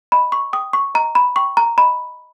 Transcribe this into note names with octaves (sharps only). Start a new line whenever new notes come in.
D#5 B5
C#6
G5 D#6
C#6
D#5 A#5
B5
G5 C#6
A#5
D#5 B5